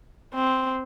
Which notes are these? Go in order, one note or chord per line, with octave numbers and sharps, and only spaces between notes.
C4